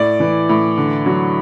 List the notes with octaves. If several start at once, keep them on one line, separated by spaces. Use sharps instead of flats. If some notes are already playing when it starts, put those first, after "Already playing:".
Already playing: A2 D5
E3
A2
D3
F#3